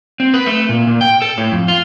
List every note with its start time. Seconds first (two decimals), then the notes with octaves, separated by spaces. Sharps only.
0.20 C4
0.34 B4
0.46 A3
0.69 A#2
0.87 A#2
1.01 G5
1.22 A4
1.38 A2
1.52 F2
1.68 F4